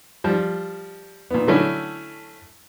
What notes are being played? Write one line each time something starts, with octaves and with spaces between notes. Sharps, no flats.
F3 G3
A#2 B3
D3 F#3 A3 C#4 E4